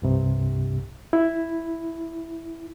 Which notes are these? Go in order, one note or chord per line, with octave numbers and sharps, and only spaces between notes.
C2 G2 C3
E4